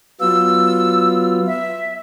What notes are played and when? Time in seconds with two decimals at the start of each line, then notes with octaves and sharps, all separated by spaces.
0.21 F#3 B3 F4 E6
1.47 E5